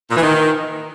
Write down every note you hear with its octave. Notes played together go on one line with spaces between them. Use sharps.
A#2
E3
D#3